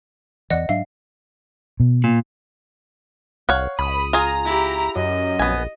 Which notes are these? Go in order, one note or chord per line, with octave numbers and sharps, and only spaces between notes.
E2 E3 D5 D#5 F#5 F#6
G#2 F#3 D4 E5 F5
B2
A#2
C2 C#5 F5 F#5
C#2 B5 D#6
F4 G#4 A#5
E4 G4
F#2 D#5
A#1 B3 G#5